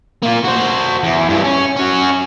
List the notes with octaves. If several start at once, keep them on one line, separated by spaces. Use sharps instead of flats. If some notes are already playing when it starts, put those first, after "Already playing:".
A#3 F4
F#4 C5
E2
G2 E3
C#4
C#4 F#4